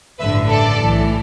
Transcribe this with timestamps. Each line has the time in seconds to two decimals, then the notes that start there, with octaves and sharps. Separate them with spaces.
0.19 A1 G2 D3 B4 E5
0.48 A4 D5
0.77 B1 A2 E3